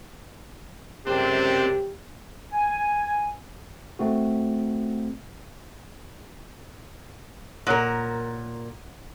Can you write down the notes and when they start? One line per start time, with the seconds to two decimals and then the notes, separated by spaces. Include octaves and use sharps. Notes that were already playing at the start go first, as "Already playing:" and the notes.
1.07 C#2 F#2 C3 C4 D4 G4
2.53 G#5
3.99 A3 C4 F#4
7.67 A#2 A#4 C#5 F#5 F#6